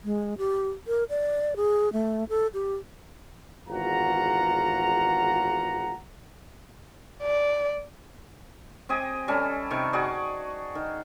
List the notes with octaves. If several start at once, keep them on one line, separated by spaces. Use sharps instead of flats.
G#3
G4
A#4
D5
G#4
A3
A4
G4
G#1 E2 F4 F#4 F#5 A#5
D5
C4 G4 D#5 G#5
G3 C#4 A4
C3 D#3 C#6
F#4 G#4 D5 C#6
D#3